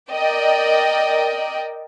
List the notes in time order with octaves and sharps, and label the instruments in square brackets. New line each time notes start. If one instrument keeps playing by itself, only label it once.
[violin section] A#4 D5 D#5 G5